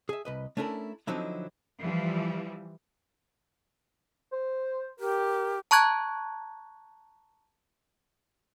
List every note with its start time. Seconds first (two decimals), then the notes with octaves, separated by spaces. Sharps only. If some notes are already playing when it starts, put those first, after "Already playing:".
0.09 G#4 E5
0.25 C2 B4 D#5
0.57 A3 C#4 D4 E4 G#4 A#4
1.07 D3 F3 F#3 C4 D#4 E4
1.80 E3 F3 G3
4.33 C5
5.00 G4 A#4
5.71 A5 A#5 C#6 F#6 G#6